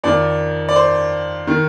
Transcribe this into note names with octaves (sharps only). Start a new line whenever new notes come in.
F2 D#3 D5
D5
C5
D#3